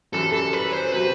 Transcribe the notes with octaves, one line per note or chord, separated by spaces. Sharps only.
F#2 E3 G3 A4
A4
B4
C5
C3 F#3 C4 B4